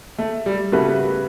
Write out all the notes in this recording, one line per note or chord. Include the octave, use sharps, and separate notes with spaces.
A3
G3
C#3 G3 A3 B3 F#4 B4